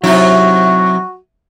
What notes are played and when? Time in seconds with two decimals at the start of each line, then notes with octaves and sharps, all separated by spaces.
0.04 C3 F#3 D#4 E4 F#4